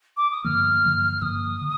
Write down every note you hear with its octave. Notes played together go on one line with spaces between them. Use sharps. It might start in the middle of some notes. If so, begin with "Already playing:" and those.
D6
D#6
G2 D3 F3 A#3 F6
G2 D3 F3 A#3
F6
G2 D3 F3 A#3 D#6
D3